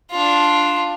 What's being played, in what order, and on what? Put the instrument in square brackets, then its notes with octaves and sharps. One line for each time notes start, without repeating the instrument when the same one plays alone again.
[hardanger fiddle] D4 F4